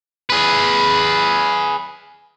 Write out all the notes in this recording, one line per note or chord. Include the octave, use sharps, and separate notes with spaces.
G#4 B4